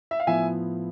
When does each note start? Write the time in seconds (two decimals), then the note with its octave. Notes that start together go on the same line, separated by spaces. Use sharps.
0.11 E5
0.20 F5
0.27 A2 F3 B3 E5 G#5